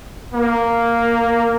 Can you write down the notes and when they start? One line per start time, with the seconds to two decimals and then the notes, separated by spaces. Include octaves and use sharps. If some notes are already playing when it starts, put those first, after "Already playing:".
0.34 A#3